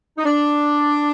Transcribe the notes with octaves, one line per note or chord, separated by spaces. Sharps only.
D#4
D4